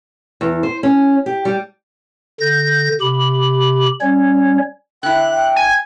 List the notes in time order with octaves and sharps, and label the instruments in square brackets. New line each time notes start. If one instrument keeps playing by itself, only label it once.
[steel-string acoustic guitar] E2
C5
C#4
G4
G3
[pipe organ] D3 G6 A#6
C3 G4 B5
G3 C#4 C#5
[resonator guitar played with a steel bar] D3 E4 [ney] G5 [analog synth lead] F#6
[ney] G5
[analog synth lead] G#5